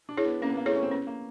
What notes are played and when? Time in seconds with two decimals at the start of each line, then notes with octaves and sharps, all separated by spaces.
0.09 D4
0.17 E4 G#4 C#5
0.25 B3
0.42 A#3 C#4
0.49 B3
0.57 A#3
0.66 A3 E4 G#4 C#5
0.75 C#4
0.83 C4
0.91 B3 C#4
1.07 A#3